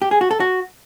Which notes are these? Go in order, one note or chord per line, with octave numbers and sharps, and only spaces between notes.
G4
G#4
F#4
A4
F#4